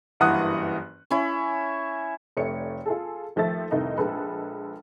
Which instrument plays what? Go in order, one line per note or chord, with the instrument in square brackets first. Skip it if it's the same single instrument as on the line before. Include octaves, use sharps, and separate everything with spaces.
[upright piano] F#1 G2 E3 F#5 D#6 F#6
[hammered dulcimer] C#4 E4
[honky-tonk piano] F1 A3 C#5 D5 C#7
F4 G#4 A4
D#2 F3 A3 A4 E5 A6
F1 C2 D#3 A3 D#4
A#1 G#3 A4 B4